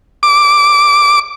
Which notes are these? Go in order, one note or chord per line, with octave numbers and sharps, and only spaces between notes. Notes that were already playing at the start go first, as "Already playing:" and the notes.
D6